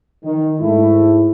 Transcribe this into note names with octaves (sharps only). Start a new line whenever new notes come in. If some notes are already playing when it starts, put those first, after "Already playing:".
D#3
G#2 A3 E4